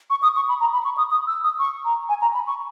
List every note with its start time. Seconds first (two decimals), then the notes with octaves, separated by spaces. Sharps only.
0.10 C#6
0.23 D#6
0.36 C#6
0.49 B5
0.60 A#5
0.73 B5
0.85 C#6
0.98 D#6
1.11 D#6
1.27 E6
1.44 D#6
1.59 C#6
1.85 A#5
2.09 G#5
2.21 A#5
2.34 B5
2.47 C#6